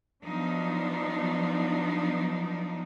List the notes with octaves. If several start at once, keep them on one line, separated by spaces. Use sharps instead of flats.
F3 F#3 B3 D4 D#4